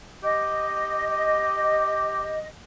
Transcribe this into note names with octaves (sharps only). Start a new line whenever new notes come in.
G4 D#5